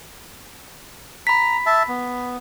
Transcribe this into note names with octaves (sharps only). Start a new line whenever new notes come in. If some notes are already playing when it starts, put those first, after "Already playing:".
A#5 B5 B6
E5 A5
B3